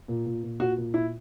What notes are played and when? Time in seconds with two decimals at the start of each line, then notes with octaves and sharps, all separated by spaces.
0.08 A#2
0.26 A#2
0.43 A#2
0.60 A#2 F#4
0.78 A#2
0.94 A#2 E4